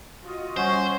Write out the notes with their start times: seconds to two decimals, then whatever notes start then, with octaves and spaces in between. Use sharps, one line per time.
0.23 F4 F#4 D#5
0.57 G3 C#4 C5 F#5 C#6